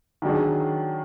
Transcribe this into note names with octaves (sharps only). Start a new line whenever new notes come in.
D#3 F#3 D4 G#4